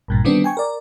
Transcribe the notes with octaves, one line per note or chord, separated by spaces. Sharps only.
A#1 G2 A#2
D3 D#3 G3 B3 C4 D4
G5 G#5 C#6
A#4 D5